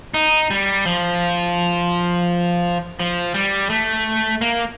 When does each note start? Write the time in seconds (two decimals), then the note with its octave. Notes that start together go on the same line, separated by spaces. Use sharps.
0.14 D#4
0.51 G3
0.86 F3
3.00 F3
3.34 G3
3.70 A3
4.41 A#3